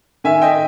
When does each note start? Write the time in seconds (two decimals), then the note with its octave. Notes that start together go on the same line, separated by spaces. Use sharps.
0.24 D#3 E5 G#5
0.41 D#5 G5